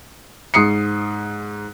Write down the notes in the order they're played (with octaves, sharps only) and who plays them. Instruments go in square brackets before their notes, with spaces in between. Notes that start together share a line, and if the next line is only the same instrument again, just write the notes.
[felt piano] G#2 D#6 C7 C#7